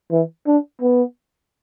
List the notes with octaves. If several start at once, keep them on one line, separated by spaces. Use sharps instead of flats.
E3
D4
B3